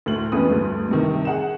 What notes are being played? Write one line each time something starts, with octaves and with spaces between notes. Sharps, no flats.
D2 A2 F#7
F2 E3 B3 C#4 B4 D#6
D2 G2
G2 C3 D#3
G#4 F#5 E7